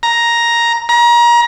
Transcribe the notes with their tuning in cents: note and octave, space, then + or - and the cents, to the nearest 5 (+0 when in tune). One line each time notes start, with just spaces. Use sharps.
A#5 +5
A#5 +30